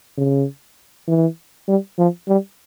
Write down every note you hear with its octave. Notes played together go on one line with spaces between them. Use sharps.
C#3
E3
G3
F3
G3